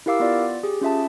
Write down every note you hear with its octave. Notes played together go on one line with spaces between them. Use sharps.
E4 G4 A#4 F5 D6 E6
B3 F4 D5
G4 G#4
C#4 F4 E5 A5